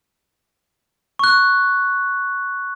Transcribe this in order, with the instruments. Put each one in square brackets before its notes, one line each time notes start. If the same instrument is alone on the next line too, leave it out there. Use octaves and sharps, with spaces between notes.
[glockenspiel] C#6 F#6